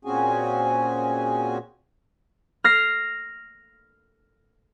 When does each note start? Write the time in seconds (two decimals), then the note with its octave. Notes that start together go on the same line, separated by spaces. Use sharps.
0.05 A#2 C4 C#4 F#4 G#4 G#5
2.64 F6 A#6 C7